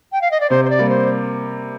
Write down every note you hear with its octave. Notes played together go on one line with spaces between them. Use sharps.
G5
F5
D#5
D5
C3 C5
C5
D5
G3 A#3
C5